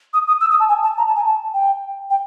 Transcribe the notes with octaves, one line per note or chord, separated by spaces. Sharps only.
D#6
D#6
E6
D#6
A5
G#5
A5
A#5
A5
G#5
A5
G5
G5